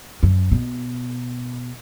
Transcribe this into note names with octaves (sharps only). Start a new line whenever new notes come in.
F#2
B2